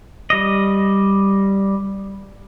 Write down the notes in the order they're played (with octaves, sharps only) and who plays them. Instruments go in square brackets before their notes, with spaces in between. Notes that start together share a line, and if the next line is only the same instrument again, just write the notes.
[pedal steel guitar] G3 D#5